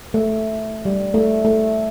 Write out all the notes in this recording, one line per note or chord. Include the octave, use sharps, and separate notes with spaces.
A3
G3
A3
A3